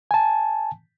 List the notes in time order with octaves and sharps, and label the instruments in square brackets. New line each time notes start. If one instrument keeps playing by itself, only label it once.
[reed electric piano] G#5 A5